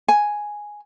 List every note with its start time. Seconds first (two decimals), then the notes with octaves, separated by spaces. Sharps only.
0.08 G#5